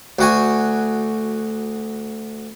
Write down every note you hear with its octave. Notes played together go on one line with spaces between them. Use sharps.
D2 F#4 G#5